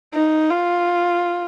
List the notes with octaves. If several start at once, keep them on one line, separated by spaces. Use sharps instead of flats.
D#4
F4